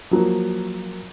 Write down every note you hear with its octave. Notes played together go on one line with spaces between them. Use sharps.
F3 F#3 A#3